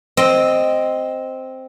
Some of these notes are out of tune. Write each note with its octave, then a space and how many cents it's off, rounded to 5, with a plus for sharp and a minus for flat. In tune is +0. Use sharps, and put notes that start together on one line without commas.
C4 +0 D#5 +0